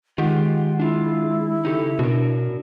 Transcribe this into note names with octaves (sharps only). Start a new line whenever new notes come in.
D#3 G#3 F4 G4 F#5
D4 E4 F4
C#3 D#4 G4 A4
B2 D4 F#4 A#4